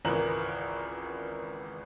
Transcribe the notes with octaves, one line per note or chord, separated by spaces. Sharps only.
G#1 C#2 E3 A#4 F#7